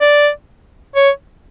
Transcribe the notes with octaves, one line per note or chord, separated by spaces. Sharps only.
D5
C#5